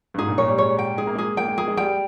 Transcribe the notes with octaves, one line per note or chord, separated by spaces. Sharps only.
G2
G#2 G#4
A#2
A#2 C#5
G3
G#3 C#5
G5
G#3 G#4
A#3
G#3 G#4
A#3 G5
G#3
A#3 G#4
G#3
G3 G5